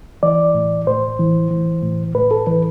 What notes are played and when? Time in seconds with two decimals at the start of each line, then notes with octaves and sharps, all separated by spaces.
0.23 E3 D5
0.54 A2
0.87 A2 C5
1.19 E3
1.51 E3
1.83 A2
2.15 A2 B4
2.31 A4
2.47 E3 B4